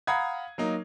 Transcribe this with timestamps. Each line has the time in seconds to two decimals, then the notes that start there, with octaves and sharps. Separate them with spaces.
0.07 F5 F#5 A#5 B5 D#6 G#6
0.58 F#3 A#3 D#4